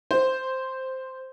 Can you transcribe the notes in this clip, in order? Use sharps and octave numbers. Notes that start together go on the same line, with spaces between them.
C5